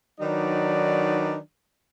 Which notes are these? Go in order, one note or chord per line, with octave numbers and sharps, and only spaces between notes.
D#3 F#3 D4 D#4 B4 D5